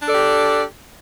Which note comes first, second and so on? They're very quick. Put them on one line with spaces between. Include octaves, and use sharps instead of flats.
D4 A4 D5 G4